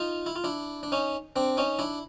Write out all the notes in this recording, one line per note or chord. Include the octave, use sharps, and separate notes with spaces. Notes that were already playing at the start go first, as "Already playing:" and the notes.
Already playing: D#4 F4
E4
F4
D4 E4
D4
C#4 D#4
C4 D4
C#4 D#4
D4 E4